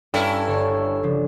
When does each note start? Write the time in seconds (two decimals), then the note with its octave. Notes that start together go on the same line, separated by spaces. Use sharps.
0.14 G2 C#4 E4 G4 A4 F#5 A#5
0.48 G1 C#5 C#6
1.03 C#3 F3 D4